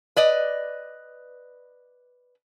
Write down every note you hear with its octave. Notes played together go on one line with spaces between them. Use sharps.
B4 D5 D#5